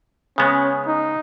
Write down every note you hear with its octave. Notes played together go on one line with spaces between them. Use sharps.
C#3 G#3 B3 C#4
D#4